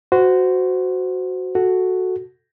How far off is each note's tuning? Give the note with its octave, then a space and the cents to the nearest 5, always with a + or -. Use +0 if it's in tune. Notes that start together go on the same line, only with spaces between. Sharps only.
F#4 +0 C5 -20
F#4 +0 A4 +0